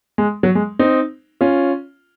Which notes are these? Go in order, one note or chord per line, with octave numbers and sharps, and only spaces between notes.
G#3
F#3
G#3
C4 D#4
C#4 F4